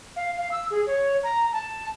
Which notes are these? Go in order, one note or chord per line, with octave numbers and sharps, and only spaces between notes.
F5
F5
E6
G#4
C#5
A#5
A5